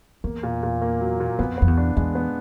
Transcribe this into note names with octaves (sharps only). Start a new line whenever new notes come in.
E2 A#3
A#2
A#2
A#3
F#3
A#2
F2 B3
F2 B3
E2
D4
E2 G#3
B3